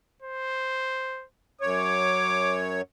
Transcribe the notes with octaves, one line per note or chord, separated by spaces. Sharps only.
C5
F#2 C#5 D6